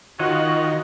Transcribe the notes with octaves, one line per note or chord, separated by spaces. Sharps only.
D#3 F4 F#4 C#5 D#5 F#5